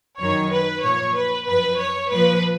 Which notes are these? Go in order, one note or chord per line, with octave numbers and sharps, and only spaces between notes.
F#2 D#3 C#5
B4
A#2 F3 C#5
B4
F#2 F3 B4
C#5
A#2 F3 B4